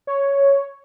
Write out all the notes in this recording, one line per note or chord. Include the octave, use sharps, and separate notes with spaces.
C#5